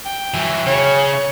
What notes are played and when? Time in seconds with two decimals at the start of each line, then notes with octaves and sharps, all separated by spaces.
0.05 G5
0.34 E3 F#3
0.66 C#3 C#5